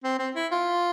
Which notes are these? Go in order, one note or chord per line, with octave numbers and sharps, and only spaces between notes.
C4
C4
E4
F4